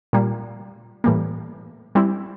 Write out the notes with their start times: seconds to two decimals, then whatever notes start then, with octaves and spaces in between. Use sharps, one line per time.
0.13 A#2 G3 A#3
1.04 A2 E3 G3 A#3
1.95 G3 C4 E4